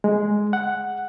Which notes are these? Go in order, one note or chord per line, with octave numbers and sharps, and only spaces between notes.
G#3
F#5